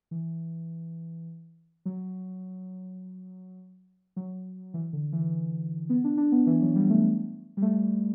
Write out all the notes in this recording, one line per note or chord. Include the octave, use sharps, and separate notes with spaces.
E3
F#3
F#3
E3
D3
E3
B3
D4
D4
B3
E3
F#3
G3
A3
G3
A3